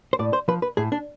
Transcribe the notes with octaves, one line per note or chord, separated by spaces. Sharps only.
C5
A2 D5
C5
F3 B4
B4
A2 G#4
D4